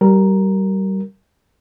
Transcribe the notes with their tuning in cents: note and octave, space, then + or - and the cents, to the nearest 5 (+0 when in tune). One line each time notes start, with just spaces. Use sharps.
G3 -25 A#4 +0